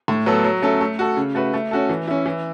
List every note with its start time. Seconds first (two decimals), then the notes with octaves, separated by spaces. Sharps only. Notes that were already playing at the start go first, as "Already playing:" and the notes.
0.08 A2
0.26 F#3 B3 A4
0.44 F#3
0.62 A3 C#4 A4
0.81 A3
0.99 F#4 A4
1.17 C#3
1.35 A3 F#4 B4
1.54 A3
1.71 C#4 F#4 A4
1.89 E3
2.07 C#4 E4
2.26 E3